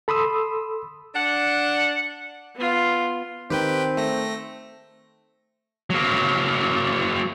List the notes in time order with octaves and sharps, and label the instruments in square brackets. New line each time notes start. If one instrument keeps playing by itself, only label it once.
[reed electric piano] A4 B5 C6 D#6 E6
[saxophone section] D4 F#5
[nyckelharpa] B3 F4
[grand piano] D#3 [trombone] C4 [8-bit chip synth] G4 B4 G5
[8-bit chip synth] A3 A#6
[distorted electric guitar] F#3 A#3